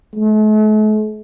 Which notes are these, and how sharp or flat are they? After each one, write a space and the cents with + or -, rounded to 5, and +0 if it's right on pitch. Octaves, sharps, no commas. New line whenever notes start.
A3 -45